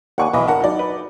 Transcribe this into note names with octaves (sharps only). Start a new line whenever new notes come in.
D#2 D5 F#5 G#5 C#6
B1 E3 D#5
D4 A#4 F#5 A5
F#3 D#4 D5
B4